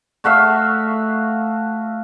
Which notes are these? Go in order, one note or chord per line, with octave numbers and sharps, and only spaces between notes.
A3 F#4 E5 F5